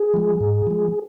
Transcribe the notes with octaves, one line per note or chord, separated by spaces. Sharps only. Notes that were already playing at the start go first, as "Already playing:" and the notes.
Already playing: G#4
F3 G#3
G#2
F3 G#3